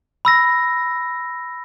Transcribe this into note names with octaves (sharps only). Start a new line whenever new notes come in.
B5 E6 A#6